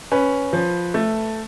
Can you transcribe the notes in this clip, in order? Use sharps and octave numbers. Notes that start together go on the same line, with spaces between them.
C#4 B4
F3
A3